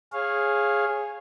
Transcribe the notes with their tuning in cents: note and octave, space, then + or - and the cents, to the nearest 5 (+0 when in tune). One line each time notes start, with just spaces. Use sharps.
G#4 +0 C#5 -20 F5 +0